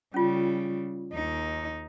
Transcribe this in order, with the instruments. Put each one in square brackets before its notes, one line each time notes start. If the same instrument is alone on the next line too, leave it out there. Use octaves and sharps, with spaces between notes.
[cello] C#3 G3 [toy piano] C#4 F4
[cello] D#2 D#4